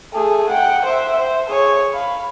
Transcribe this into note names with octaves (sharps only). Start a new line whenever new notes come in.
A3 G#4
F#5 G5
C5 E5
C5
G#4 C#5
F5 B5